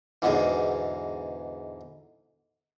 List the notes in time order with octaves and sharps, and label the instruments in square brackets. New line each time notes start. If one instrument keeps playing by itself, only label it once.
[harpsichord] E2 G#2 B2 D3 E3